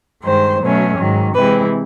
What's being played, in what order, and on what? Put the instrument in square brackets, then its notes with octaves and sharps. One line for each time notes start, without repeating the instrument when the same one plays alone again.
[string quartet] G2 D#3 G#3 C5
B2 F#3 A3 C#4
G#2 D#3 F#3
C3 E3 G#3 C4 E4 B4